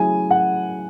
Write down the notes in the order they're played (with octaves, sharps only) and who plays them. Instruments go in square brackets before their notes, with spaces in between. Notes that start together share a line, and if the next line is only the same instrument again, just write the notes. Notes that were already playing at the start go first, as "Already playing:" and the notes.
Already playing: [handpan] F#3 A3 C#4 E4 G#4 [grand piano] G#5
[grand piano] F#5